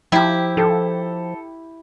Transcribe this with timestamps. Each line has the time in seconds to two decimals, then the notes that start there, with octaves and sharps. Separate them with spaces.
0.12 F3 E4 G4 G5 A#5
0.57 F3 A4